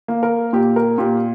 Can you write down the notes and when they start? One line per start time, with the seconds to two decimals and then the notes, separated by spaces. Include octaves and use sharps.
0.08 A#3
0.23 A#4
0.53 A#2 G4
0.76 A#4
0.98 A#2 G4